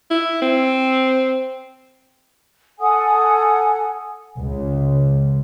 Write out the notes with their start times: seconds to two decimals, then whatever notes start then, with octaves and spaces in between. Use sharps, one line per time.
0.10 E4
0.42 C4
2.80 A4 F#5 G#5 D#6
4.38 C#2